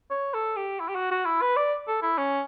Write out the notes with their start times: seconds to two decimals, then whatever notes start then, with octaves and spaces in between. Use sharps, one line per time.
0.11 C#5
0.34 A4
0.57 G4
0.80 E4
0.89 G4
0.95 F#4
1.11 F#4
1.25 E4
1.42 B4
1.57 D5
1.88 A4
2.02 E4
2.18 C#4